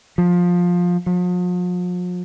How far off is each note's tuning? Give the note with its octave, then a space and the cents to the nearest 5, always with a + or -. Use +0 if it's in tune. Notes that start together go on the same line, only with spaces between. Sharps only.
F3 +15
F3 +45